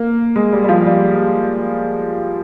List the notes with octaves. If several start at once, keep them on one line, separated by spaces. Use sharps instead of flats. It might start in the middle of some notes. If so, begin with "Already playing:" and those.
Already playing: A#3
G#3
G3
G3
F3
G3